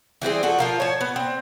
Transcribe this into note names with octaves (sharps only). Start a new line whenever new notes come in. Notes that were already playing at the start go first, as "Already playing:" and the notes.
E3 G3 C4 G#4
F4 F#4 A4
F3 F4 A#4
C#5 A5
B3
C4